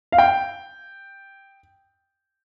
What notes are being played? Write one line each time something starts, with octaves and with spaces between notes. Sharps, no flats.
F5
G5